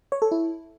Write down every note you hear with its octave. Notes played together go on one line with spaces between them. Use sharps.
C#5
A4
E4